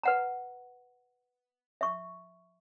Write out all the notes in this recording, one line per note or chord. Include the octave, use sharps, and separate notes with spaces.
B4 F#5 A#5
E5 C#6